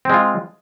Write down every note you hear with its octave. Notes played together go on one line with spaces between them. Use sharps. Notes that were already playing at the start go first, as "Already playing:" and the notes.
G#3 C4 F4